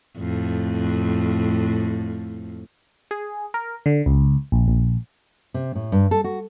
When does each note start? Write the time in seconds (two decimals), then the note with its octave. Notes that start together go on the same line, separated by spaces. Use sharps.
0.18 F2 A2
3.11 G#4
3.54 A#4
3.86 D3
4.06 C#2
4.52 A#1
4.68 A#1
5.54 C3
5.75 A2
5.92 G2
6.11 A4
6.24 F#4